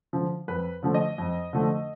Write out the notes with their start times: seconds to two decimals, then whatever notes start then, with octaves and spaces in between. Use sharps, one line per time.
0.13 D3 F3
0.48 F2 B4
0.83 D3 F3 A3
0.94 D#5
1.18 F2
1.53 D3 F3 A3